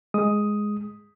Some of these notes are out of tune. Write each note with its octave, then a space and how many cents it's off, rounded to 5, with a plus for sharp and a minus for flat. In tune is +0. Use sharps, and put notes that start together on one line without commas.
G#3 +0 D#6 +5